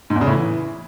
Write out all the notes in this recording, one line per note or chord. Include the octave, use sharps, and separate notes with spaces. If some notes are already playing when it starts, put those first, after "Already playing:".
G#2
E2
C#3
A2
E3